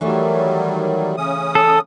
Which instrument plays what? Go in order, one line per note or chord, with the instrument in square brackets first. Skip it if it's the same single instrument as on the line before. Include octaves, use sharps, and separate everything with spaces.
[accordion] D#3 F#3 G3 [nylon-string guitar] E3 A3 C#5
[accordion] C#3 C#4 D#6
[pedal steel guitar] A4